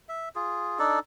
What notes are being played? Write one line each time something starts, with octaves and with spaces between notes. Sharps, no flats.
E5
F4 G#4
D4 D#4 A4 D5